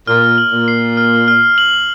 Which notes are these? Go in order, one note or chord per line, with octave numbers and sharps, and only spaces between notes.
A#2 F6
F#7
A#2
C7
F6
F6
F#7